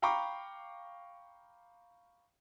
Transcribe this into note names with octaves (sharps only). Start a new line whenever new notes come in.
F5 G5 A#5 B5 C#6 D6